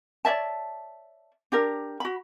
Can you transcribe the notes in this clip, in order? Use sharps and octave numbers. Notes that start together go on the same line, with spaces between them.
C#5 D5 E5 A5
D4 G4 A#4
F#4 B5